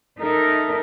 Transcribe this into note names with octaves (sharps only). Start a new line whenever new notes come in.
D#4 A4 A#4 E5